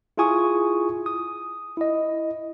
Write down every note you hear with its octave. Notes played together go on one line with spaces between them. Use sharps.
E4 F4 G#4 G#5 C#6 D#6
D#6
E4 D#5